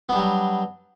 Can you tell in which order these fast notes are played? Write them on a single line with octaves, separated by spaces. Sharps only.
B3 D4 G3 F#3